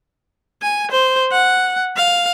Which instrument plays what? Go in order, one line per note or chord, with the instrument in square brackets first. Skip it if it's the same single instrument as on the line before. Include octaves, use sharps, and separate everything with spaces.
[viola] G#5
C5
F#5
F5